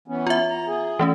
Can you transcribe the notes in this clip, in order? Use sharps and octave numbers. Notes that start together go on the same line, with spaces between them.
E3 B3 C#4
F4 E5
A#5
G#4
E3 A3 C#4